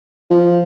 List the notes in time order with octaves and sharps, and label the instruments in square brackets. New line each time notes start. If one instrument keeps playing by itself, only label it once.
[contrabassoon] F3